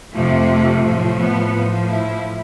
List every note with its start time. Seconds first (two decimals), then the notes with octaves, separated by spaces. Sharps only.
0.14 F2 C3 F3 A3
0.84 A2 F3 A3
1.19 B3
1.53 A2 F3
1.88 E4